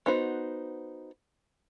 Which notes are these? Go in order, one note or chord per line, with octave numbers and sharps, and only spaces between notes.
B3 D#4 F#4 C5